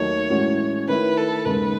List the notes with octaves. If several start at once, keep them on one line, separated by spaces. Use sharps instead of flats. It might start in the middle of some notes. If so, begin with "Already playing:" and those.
Already playing: D#2 D#3 F#3 A3 D#4 C#5
A2 E3 G#3 C#4 F#4
D#3 A3 E4 B4
A4
D#2 C#3 G#3 D#4 B4